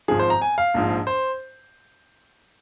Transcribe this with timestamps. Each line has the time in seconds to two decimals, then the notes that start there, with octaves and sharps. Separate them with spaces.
0.08 G#1 G#2 F3 G#4
0.19 C5
0.30 A#5
0.42 G#5
0.58 F5
0.74 A#1 G#2 F3
1.07 C5